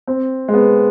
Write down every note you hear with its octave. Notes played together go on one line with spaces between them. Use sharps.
C4
G#3
B3